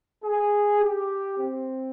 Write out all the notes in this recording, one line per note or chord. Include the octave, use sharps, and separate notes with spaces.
G#4
G4
C4